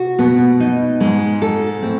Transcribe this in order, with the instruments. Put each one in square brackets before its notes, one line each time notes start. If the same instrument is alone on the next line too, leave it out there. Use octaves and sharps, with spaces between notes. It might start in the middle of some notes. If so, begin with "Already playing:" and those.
Already playing: [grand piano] C3 [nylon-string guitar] F#4
[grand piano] B2 [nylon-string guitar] B3
[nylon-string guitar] D#4
[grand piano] G#2 [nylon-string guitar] G#3
[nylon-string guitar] A4
[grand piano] A2 [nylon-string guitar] C4